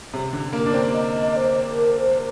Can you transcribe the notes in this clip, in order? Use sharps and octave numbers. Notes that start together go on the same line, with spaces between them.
C3
D3
A#3
D4
C4
D#5
D#5
C5
A#4
C5